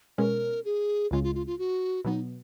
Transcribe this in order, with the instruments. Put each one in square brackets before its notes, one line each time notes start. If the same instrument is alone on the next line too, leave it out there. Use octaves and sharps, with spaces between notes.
[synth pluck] B2 G#3 C#4 [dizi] A#4
[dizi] G#4
[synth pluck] C#2 C#3 G#3 [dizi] F4
[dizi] F4
F4
F4
F#4
[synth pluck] B2 F#3 B3 [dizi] D#4